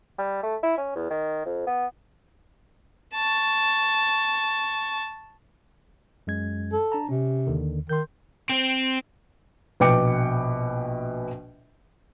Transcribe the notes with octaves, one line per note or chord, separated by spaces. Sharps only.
G3
A3
E4
C#4
E2
D#3
F2
B3
A5 C#6
F#2 G#3 G#6
A4
D4 A5 A#5
C3 C#4
D#2 D3 D#3
D#3 C6 G6
C4
A#1 B2 B4 G5 D6 C#7